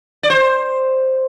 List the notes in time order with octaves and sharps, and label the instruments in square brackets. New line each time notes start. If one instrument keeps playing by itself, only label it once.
[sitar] D5
C5